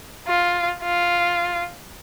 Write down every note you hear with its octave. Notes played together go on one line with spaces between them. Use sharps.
F4
F4